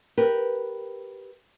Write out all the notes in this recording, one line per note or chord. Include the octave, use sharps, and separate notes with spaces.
G4 A#4 B4